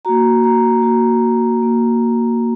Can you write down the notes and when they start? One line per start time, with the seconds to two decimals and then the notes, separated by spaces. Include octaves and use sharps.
0.05 A#3 F#4 A#5
0.44 A#5
0.82 A#3 F#4
1.60 A#3 F#4